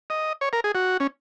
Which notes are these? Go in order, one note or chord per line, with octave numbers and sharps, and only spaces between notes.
D#5
C#5
A#4
G#4
F#4
C#4